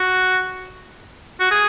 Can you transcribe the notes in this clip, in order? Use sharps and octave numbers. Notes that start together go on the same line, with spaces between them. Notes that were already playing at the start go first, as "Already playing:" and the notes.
Already playing: F#4
F#4
G#4